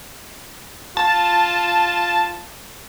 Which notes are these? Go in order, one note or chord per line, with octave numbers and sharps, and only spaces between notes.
F4 A5